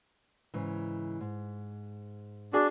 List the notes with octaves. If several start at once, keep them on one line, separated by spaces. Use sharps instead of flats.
G#2 C#3 E3
G#2
D4 F#4 G#4